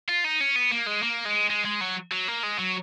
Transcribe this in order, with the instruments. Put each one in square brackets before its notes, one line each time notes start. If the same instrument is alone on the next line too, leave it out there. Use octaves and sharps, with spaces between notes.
[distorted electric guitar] F4
D#4
C#4
B3
A#3
G#3
A#3
G#3
G#3
G#3
F#3
F#3
A#3
G#3
F#3